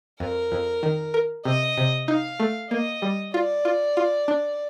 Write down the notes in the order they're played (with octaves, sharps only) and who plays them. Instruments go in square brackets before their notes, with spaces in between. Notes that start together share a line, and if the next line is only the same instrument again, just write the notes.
[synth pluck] F2 [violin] A#4
[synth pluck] F2
D#3
A#4
[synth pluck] C3 [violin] D#5
[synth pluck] C3
[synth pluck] D#4 [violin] F5
[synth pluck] A3
[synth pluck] A#3 [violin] D#5
[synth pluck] G3
[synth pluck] F4 [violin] D5
[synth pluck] F4
F4
D4